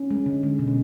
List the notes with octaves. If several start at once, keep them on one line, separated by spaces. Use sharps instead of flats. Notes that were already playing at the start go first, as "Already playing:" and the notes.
Already playing: C#4
G#3
D3
G#3
B2
C#4